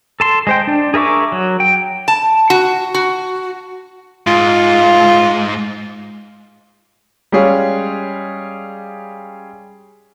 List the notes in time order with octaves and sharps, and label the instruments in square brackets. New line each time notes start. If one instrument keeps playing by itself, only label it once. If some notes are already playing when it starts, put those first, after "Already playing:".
[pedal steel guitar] A4 A5 C6
G#3 C5 G5
D4
G#4 A#4 E5 C#6 D6
F#3
G5
[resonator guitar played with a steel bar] A5
F#4
F#4
[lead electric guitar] G#2 [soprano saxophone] F4
[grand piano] G3 G#3 C#4 G#4 C#5 F5